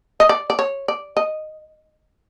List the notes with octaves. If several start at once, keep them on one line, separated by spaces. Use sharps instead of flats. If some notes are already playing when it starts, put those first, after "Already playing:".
D#5
D5
D5
C#5
D5
D#5